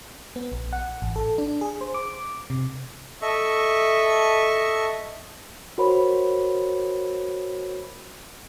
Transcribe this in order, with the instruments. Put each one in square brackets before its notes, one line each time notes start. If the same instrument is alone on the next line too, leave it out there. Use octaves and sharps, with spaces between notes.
[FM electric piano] B3
A#1
F#5
A1
A4
D4
G#4
C5
D6
C3
[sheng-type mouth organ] A4 D#5 E5 C#6
[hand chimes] F#4 A#4 C5 C#5 B5